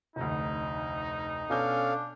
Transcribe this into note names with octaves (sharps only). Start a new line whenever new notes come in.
F1 D2 D#4
B2 C#4 D4 A4 F5 G#5 G6